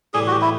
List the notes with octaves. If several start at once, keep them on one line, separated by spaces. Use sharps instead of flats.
A2 E3 G3 G#4
F#4
G4
E4